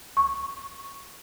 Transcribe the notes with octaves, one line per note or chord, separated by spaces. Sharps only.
C#6